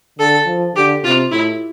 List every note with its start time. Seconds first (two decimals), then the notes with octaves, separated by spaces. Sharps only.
0.19 D3 A4
0.47 F3
0.75 D3 G4
1.04 C3 F4
1.31 A2 E4